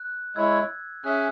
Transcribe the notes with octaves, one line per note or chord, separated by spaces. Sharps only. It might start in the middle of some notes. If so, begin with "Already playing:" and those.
Already playing: F#6
G#3 E4 C#5 E6 G#6
C#4 G#4 E5 F#6